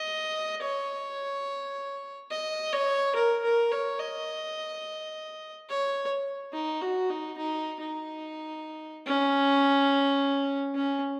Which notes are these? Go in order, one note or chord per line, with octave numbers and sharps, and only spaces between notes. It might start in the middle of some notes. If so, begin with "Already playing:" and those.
Already playing: D#5
C#5
D#5
C#5
A#4
A#4
C#5
D#5
C#5
D#4
F#4
D#4
D#4
D#4
C#4
C#4